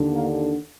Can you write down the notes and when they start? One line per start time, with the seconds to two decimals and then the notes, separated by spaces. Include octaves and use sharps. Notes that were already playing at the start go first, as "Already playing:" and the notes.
Already playing: D#2 D3
0.14 A#3